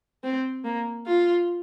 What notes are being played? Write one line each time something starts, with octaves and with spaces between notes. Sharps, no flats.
C4
A#3
F4